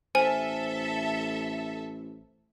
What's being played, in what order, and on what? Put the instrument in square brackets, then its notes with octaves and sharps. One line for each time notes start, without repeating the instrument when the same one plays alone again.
[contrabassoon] A1 [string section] A4 E5 [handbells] C5 [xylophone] G#5